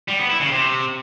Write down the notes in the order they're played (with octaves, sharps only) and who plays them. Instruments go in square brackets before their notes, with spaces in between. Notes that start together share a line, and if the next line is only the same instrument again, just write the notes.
[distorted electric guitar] G3
B3
E4
C#3
C3